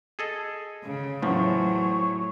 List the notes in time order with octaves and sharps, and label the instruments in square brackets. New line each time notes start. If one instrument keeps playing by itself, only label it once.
[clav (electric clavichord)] G#4 A4 D#5
[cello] C#3
[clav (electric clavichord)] E2 F3 [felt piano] A2 [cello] F#3 A3 [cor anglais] C#5